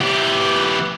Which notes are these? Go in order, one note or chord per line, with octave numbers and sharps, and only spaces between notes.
E3 G4